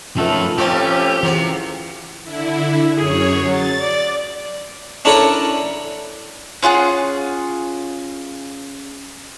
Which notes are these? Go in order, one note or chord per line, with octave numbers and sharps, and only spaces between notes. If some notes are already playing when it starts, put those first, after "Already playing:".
D#3 F3 F#3 A3 C#4 F4 A4 B4
A2 F3 G3 A3 C4 C#4 F4 G4
C3 E3 F#3 G#4
D3 E4
F#2 G#4 C#5
F#3 A6
D5
C#4 D4 E4 A4 A#4 C#5
C#4 F4 G#4 F#5